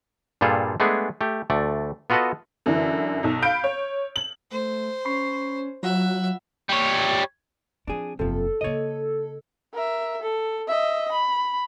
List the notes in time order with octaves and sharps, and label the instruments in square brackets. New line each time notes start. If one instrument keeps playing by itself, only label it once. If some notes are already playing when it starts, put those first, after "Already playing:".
[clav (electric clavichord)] G2 A#2 G3 F4 G#4 A4
G#3 A3 B3 D4 G#4
A3 G4
D2 A3 D5
B3 F4 F#4 A4 B4 D#5
[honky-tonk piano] F#2 D3 E3
B1 D#4
F5 B5 G6 D7
C#5
F#7
[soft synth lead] A3 [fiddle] C5
[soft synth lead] C#4 [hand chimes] B5 C#6 C7
[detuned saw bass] F#3 [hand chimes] F4 F#5 [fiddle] E5 [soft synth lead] F#6
[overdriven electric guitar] G3 C#5
[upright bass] F3 C4 [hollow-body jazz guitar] D4 G#4
[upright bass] F#1 E2 [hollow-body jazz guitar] C3 F3 [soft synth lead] A4
[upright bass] C#3 A#3 [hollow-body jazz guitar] C#5 D#5
[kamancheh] A#4 E5
A4
D#5 E5
B5